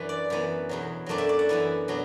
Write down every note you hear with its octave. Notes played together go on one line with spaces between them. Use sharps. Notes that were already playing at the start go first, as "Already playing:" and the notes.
Already playing: F#2 E3 D4 B4
D5
F#2 E3 B3
E2 B2 F#3
F#2 F#3 A3 D4 D5
E5
D5
F#5
F#2 E3 B3 E4
B2 F#3 D4